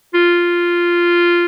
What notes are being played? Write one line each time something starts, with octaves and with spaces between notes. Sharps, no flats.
F4